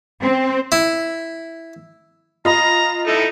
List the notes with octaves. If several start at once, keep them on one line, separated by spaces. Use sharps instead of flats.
C4
E4
F4 D#5 A#5 B5
D#4 E4 A4